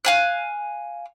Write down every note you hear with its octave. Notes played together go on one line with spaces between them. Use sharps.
F5 G#5 F#6